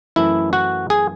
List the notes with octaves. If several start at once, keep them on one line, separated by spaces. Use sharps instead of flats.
F#2 E3 A3 E4
F#4
G#4